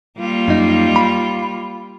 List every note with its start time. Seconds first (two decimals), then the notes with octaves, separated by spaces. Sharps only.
0.19 G3 A#3 F4
0.48 F#2 D#4
0.96 B5